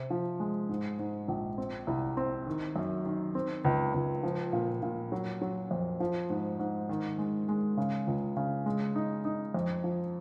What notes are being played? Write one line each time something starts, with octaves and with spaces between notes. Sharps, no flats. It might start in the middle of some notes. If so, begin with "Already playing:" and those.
Already playing: C3
F3
G#3
G#2
G#2
A#1
C4
C2
C4
D#3
F#2
D#3
C4
C#2
C#2
F3
A#2
A#2
F#3
F#3
F2
F3
G#2
G#2
D#3
G#3
G#3
C#3
C#2
C#3
G#3
D#4
D#4
F2
F3